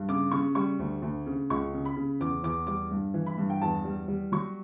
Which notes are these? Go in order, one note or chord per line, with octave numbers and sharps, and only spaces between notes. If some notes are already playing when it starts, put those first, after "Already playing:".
Already playing: G2
C#3 D6
C#3 C#6
G3 C#6
D2
D2
C#3
C#2 C#6
C#3
B5
C#3
E2 D6
E2 D6
G3 D6
G2
E3
B5
G2
G5
E2 A5
G3
G3
F#3 C#6